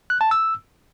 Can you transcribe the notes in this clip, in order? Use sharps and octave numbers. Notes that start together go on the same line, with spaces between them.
F#6
A5
E6